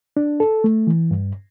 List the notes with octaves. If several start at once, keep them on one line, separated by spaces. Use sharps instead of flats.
D4
A4
A3
E3
G2